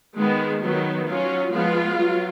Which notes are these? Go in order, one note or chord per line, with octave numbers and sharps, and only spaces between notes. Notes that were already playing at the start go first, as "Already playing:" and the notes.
D#3 G#3 B3
D#3 F#3 B3
F#3 C#4 F4
F3 G#3 B3 F4
F#3